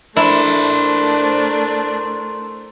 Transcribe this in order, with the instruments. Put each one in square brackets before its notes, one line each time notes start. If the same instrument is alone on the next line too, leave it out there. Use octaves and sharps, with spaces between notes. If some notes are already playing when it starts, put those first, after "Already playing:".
[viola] A3 [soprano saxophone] D4 [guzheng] E4 [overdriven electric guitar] A#4 C5